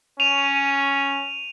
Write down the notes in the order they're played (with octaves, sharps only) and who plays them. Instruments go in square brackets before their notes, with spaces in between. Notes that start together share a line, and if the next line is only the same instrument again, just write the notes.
[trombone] C#4 [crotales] D#7 F7